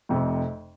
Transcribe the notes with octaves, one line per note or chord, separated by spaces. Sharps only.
F1 F2 C3